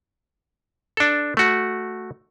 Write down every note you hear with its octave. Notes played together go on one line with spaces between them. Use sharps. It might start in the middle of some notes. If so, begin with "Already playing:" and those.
D4 A4
A3 F#4